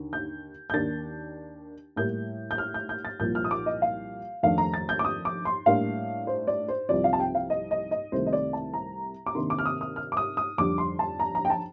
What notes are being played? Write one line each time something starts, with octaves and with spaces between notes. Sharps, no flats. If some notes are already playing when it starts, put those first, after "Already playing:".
Already playing: D#2 D3
G6
G6
D#2 D#3 A#3 D4 A6
A2 G3 A#3 G6
G6
F6
G6
G6
A6
C2 A#2 F3 A#3 G6
F6
D#6
D6
D#5
F5
F2 D#3 A3 D4 F5
A#5
A6
G6
D6
D#6
D6
C6
A2 G3 A#3 D4 F5
C5
D5
C5
C2 C3 F3 D5
F5
A5
G5
F5
D#5
D#5
D#5
C2 C3 D#3 A3 C5
D#5
D5
A5
A#5
D6
C3 D#3 A#3 D4 C6
D6
F6
D#6
D#6
F6
D6
D#6
D#6
F2 D3 G3 D4 D6
C6
A5
A#5
A#5
G5
A5